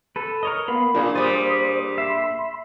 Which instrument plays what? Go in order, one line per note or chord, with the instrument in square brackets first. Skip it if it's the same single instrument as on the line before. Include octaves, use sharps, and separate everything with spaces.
[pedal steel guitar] A4 B4
A#4 C#5 D#5
[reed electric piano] A#3 B3 [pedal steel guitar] B5 [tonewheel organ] C6
[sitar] A#2 [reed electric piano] A#3 D4 G#4 [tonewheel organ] F4
[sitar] A#2 G3 [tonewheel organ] C5 D#6 [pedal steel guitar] D5
[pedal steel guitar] E5 [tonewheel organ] B5 C6